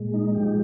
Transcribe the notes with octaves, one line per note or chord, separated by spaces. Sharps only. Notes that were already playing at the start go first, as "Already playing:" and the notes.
Already playing: A#2 G#3
D#4
F3 G4